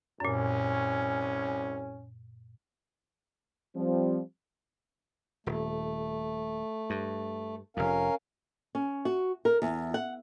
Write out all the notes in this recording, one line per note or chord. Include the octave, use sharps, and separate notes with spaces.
C2 F#2 A#2 C#4
F3 G3 C4
D#1 A3
G2
F1 F2 C#4 A#4 F5
C#4
F#4
A#4
E2
F#5